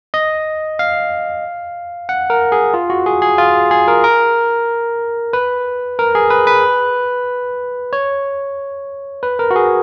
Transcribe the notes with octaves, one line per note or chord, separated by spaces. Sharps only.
D#5
F5
F#5
A#4
G#4
F4
F#4
G#4
G#4
F4
G#4
A#4
A#4
B4
A#4
G#4
B4
B4
C#5
B4
A#4
F#4
G#4